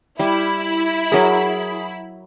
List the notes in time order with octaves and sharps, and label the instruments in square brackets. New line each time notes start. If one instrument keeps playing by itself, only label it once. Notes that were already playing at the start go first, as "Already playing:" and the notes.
[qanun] G3 [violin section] E4 B5
[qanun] F#3 A#4 [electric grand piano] G#4